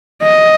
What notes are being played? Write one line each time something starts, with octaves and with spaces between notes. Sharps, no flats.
D#5